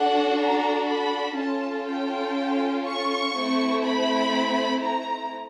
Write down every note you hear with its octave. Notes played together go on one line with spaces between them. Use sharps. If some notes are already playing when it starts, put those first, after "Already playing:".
Already playing: D4 F#4 A4 F#5
A#5
B5
C#4 F4 A4 A5
G5
C#6
A3 C4 E4
B5
A#5